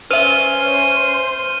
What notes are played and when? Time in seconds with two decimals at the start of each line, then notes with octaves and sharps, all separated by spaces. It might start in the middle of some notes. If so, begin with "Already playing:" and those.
0.11 C#4 B4 C5 E5 F6 D#7